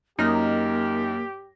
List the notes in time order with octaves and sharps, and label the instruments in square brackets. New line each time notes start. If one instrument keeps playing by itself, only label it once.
[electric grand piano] F#2 F6 A#6 [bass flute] A#3 [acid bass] D#4 [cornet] G4